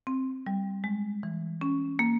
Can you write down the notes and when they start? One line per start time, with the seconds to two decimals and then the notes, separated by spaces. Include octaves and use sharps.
0.07 C4
0.46 G3
0.84 G#3
1.23 E3
1.61 C#4
1.99 A#3